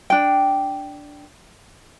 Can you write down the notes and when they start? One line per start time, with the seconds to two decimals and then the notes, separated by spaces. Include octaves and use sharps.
0.10 D4 G5